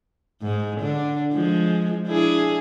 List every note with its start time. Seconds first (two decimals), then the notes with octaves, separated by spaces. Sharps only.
0.42 G#2 G#3
0.81 D3 D4
1.33 F3 G#3
2.07 D4 E4 G#4